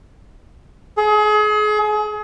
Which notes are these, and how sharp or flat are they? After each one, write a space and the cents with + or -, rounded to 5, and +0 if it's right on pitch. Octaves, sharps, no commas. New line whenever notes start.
G#4 +35